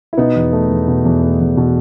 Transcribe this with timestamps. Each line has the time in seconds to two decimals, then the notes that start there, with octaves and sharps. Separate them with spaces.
0.13 E4
0.17 B2 B3 D#4
0.36 E2
0.52 A3
0.70 E2
0.88 B2
1.05 E2
1.23 A3
1.40 E2
1.57 B2